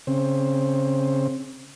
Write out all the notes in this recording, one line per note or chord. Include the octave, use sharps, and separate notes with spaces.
C#3 C4